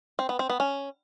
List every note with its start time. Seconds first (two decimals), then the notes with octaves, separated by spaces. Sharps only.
0.19 C4
0.29 B3
0.39 C4
0.50 B3
0.60 C#4